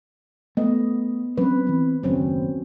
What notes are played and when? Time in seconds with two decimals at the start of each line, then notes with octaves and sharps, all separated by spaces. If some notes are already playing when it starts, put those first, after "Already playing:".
0.57 A3 B3 D#5
1.37 F#3 C4 C#4 B4
1.67 E3 C4
2.03 F#1 D#2 F#3 C4 C#4